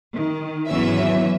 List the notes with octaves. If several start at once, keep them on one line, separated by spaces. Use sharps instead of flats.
D#3
G#1 E2 E3 F#3 C#4 E5